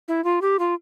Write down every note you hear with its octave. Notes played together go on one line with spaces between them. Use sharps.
E4
F4
G4
F4